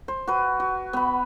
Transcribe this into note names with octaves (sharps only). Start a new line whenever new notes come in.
C5
F#4 B4
F#4
B3 B5